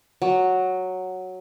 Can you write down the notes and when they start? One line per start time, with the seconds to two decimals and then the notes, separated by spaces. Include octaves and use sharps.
0.22 F#3